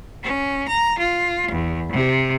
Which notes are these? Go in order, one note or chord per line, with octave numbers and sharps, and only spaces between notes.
C#4
A#5
F4
E2
C3